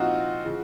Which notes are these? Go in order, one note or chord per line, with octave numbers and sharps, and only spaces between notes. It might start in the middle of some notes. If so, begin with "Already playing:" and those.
Already playing: A#2 F3 C4 D#4 F4 F#4
C#3 F3